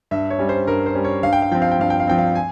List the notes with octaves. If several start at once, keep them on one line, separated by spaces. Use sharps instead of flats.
G2 E5
C#5
G3 C#4
C5
G2 A#4
C5
G3 C#4
C#5
G2 F5
G5
F5
F3 C4 G5
F5
G5
G2 F5
G5
F5
F3 C4 G5
F5
G#5